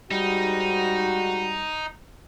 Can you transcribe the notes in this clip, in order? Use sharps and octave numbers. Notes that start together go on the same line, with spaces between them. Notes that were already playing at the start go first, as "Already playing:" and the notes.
G#2 G3 D#4 F#4